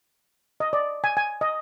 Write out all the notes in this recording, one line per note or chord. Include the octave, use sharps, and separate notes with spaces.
D#5
D5
G#5
G#5
D#5